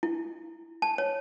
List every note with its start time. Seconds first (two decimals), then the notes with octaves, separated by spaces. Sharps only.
0.03 E4
0.82 A5
0.98 C#5